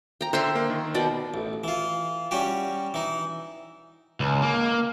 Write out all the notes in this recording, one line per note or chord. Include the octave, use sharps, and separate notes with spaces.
G5 A#5
D3 C5 E5 G5 C6
A#3
D#3
B2 D5 G5
A1
E3 F4
G3 C#4 F#4 G4
E3 D#4
C#2
A#3